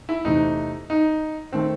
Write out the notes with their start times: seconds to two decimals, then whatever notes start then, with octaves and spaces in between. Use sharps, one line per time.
0.09 E4
0.25 E2 C3 E3 A3 D#4
0.90 D#4
1.53 D#3 A3 C4